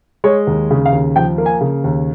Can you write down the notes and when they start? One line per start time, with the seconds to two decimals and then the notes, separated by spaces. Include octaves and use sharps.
0.24 G#3 C#5
0.47 D#2
0.71 C#3
0.86 F5
0.92 D#2
1.16 F3 G5
1.38 A#3
1.46 G#5
1.61 C#3
1.84 D#2